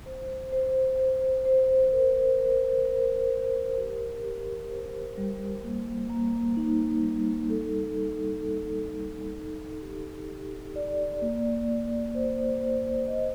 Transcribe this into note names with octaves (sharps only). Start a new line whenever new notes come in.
C5
C5
C5
C5
A#4
A#4
A#4
A#4
G4
G4
C5
G3
A#3
A#3
D#4
G3
A4
D#4
A4
A4
D#4
G4
G4
D5
A#3
A#3
C5
C5
D#5